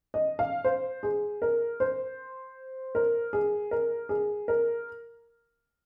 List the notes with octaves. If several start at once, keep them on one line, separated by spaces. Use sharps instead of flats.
D#5
F5
C5
G#4
A#4
C5
A#4
G#4
A#4
G#4
A#4